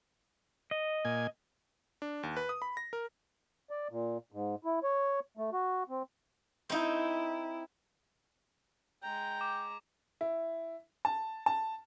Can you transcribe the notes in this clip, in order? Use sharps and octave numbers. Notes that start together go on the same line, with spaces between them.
D#5
A#2 G#5
D4
D#2
B4
D#6
B5
A#6
A#4
D5
A#2
G#2
E4
C#5
A3
F#4
C4
C4 D#4 E4
G#3 G5 A#5
D6
E4
A5
A5